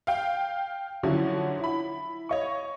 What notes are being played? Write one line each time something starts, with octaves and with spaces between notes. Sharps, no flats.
F5 G5
D3 F3 F#3 C#4 E4
E4 B5
C#5 D#5 C#6